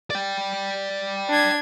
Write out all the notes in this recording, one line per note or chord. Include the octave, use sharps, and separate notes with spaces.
D5 G5
D4 G#6